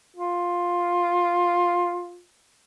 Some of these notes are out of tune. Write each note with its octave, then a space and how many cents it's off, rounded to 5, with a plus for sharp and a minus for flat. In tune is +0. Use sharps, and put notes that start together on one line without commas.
F4 +10